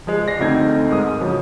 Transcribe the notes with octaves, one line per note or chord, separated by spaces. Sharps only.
F3 G#3
D5 A#6 C7
D2 C4 D#4 A4 G#6
G#2 G#3 A#4 D#6
C#3 F3 F#3